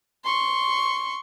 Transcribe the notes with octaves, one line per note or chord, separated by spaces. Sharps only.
C6 C#6